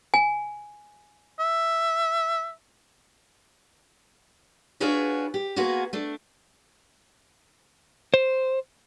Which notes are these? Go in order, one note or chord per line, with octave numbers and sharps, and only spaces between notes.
G#5
E5
D4 F4 F#4 G#4 B4 C#5
G4
A#3 B3 F4 F#4 G#4
A3 D4
C5